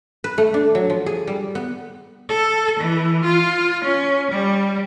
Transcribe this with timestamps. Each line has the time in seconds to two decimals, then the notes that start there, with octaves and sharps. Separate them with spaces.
0.24 B4
0.38 A3
0.54 D4
0.75 F#3
0.90 F3
1.06 G#4
1.27 G3
1.55 B3
2.29 A4
2.79 E3
3.24 F4
3.84 C#4
4.31 G3